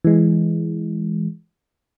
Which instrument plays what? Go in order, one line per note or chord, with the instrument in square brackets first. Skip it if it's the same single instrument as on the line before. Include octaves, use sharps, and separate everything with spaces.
[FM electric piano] E3 G#3